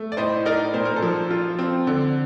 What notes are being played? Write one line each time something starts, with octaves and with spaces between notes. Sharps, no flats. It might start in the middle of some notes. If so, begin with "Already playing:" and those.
Already playing: A3
D5
A2 C5 D#5
D#4 A#4 D5
A#2 C5
A#4
A4 C5
F3
F4
C4
D3